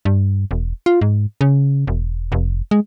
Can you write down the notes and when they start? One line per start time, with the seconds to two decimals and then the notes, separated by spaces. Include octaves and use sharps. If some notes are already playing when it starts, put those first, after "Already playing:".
0.05 G2
0.51 E1
0.86 F4
1.01 G#2
1.41 C#3
1.87 E1
2.32 F1
2.71 G#3